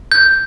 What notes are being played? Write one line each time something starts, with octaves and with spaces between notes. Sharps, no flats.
G6